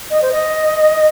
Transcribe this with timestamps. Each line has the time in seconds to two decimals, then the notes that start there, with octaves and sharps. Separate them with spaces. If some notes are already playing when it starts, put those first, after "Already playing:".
0.10 D#5
0.21 C5
0.32 D#5